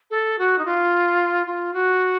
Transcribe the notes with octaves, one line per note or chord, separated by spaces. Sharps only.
A4
F#4
D#4
F4
F4
F#4